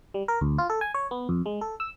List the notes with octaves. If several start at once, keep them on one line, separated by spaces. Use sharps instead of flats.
G3
A#4
D2
F4
A4
G#5
C#5
B3
F2
G#3
A4
E6